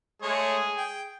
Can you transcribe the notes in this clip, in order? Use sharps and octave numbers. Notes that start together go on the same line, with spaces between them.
G#3 A3 G#4 C#5
G5